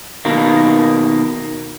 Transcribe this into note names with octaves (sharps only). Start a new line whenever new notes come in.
B2 D#3 A#3